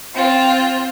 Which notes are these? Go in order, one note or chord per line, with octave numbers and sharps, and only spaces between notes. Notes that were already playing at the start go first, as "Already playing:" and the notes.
C4 F4